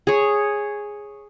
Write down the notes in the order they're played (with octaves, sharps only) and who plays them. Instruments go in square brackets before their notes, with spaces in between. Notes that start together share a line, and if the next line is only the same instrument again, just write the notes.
[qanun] G#4 C#5